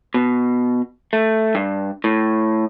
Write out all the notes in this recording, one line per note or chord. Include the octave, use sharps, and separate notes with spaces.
B2
A3
G2
A2